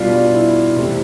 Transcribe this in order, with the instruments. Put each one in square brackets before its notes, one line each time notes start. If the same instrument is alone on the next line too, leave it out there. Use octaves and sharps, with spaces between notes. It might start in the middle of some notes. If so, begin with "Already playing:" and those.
Already playing: [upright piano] B2 G3 D4 F4
E4
C3 E3 A3 C4 E4